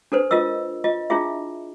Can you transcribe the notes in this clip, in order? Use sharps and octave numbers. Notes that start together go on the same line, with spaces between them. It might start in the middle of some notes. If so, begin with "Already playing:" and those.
D4 A4 B4 C5
F4 A#4 D#5 E6
F4 D#5
D4 E4 F4 G#4 E5